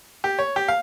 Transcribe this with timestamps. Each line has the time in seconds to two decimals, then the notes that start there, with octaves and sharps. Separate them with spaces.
0.24 G4
0.39 C#5
0.56 G4
0.68 F5